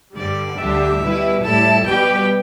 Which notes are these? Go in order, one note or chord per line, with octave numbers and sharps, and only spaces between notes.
G2 D3 G3 D5
D2 D3 G3 D4 G4 E5
B2 G3 E4 B4
A2 G3 E4 A4 A5
B2 G3 B3 G4 B4 G5